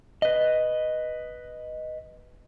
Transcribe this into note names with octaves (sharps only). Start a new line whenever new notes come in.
B4 D#5